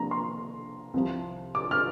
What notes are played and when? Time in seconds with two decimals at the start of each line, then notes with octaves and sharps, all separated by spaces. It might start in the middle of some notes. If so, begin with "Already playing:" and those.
Already playing: C3 F3 A#3 D4 A#5
0.11 C6
0.94 C2 C3 F3
1.55 D6
1.71 F6